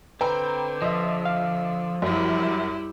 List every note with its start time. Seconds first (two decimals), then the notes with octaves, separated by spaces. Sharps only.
0.21 D3 C4 B4 G5 A#5 B5
0.82 F3 D#5 E5
1.25 F5
2.02 F#2 G3 E4